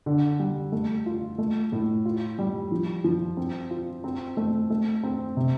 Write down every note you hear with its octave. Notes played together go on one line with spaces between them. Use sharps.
D3
G3
A3
F4
A3
A2
F4
G3
F3
F3
C4
F4
C4
A3
A3
C4
C3